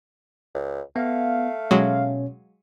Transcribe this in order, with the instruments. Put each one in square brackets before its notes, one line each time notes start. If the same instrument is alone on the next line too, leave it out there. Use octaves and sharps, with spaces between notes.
[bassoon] C#2
[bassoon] A3 [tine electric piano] B3 [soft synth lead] F5
[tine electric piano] B2 C#4 C#5 [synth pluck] F#3 G#3